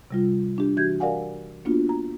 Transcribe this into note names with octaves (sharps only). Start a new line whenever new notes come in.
C3 G3 F4
D4 G4
E3 F#4 G6 G#6
G4 A#4 D5 F5 F#5 G#5
A#3 B3 D4 F4 F#4
A#5